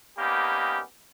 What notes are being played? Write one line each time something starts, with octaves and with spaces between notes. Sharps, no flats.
G3 A#3 B3 C#4 D#4 G4